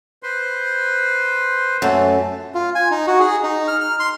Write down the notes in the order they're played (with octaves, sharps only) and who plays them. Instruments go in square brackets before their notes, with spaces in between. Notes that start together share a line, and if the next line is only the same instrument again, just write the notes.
[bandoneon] B4 C5 C6
[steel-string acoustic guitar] F#2 A3
[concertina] F4
G#5
D#4
F#4
G#4
D#4
F6
F6
C6